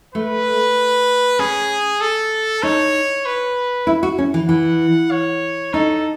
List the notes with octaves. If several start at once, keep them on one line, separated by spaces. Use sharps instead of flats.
A3 B4
C#4 G#4
A4
D#4 C#5
B4
E4
F#4
C#4
E3
E3 F#5
C#5
D#4 A4